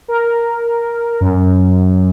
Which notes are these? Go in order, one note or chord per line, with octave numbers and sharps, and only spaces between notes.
A#4
F#2